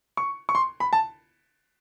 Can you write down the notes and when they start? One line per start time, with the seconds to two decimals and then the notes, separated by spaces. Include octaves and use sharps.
0.17 C#6
0.49 C#6
0.55 C6
0.80 B5
0.93 A5